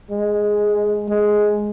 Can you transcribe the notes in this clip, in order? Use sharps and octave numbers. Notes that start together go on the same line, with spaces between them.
G#3
G#3